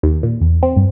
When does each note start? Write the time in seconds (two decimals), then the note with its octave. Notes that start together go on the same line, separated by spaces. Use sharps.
0.03 D#2
0.23 A#2
0.41 E2
0.63 C4
0.76 G2